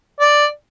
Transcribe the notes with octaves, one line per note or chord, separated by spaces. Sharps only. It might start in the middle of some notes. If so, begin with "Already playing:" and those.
D5